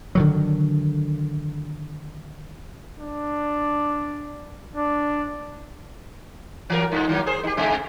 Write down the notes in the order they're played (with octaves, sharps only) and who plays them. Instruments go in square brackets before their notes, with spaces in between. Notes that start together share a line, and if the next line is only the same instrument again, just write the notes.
[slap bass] D3 D#3 F#3
[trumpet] D4
D4
[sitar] E3 F#3 A#4
G2
D#3 F#3 A#3
G#4 C5
D#4 G4
C3 G#3